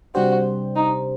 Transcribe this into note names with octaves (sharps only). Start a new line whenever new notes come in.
C3 G3 D4 F#4 G4 C5
D#4